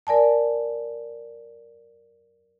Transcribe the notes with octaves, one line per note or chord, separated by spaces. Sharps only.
A#4 D5 G#5 A5